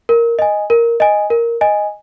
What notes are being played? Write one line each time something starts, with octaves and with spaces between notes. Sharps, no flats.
A#4
D#5 G#5
A#4
D#5 G#5
A#4
D#5 G#5